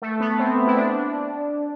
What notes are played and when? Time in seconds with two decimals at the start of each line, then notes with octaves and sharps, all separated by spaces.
0.02 A3
0.20 B3
0.39 C4
0.67 E4
0.76 D4